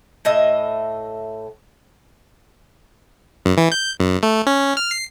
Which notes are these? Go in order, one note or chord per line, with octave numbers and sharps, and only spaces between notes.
A2 D#5 E5
F#2
E3
G6
F#2
A3
C#4
F6
C7